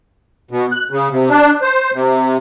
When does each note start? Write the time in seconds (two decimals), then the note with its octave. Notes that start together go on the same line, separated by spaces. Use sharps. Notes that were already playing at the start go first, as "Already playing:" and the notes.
0.51 B2
0.72 F#6
0.91 C#3
1.11 C3
1.30 D4
1.62 C5
1.94 C3